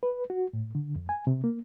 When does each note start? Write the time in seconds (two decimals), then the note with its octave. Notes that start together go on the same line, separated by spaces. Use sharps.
0.03 B4
0.30 F#4
0.53 A2
0.75 D3
0.96 F2
1.09 G#5
1.27 C3
1.44 A#3